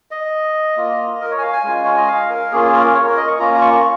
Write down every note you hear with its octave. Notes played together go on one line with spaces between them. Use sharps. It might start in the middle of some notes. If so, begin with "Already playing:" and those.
D#5
A#3 F4
A#4
C#5
G#5
F5
G#5
G#3 C#4 F4
C#5
D#5
F5
A#4
A#3 C#4 F4 G#4
A#4
C#5
A#4
D#5
C#6
A#3 C#4 F4 A#5
A#5
C#6